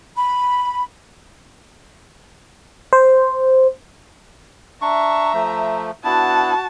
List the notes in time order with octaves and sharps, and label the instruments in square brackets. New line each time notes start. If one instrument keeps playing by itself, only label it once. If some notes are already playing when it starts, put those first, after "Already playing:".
[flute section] B5
[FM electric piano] C5
[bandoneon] D4 C#6 [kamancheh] E5 A#5
[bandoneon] F3 A3
[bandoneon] B3 D4 E4 [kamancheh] F#4 A5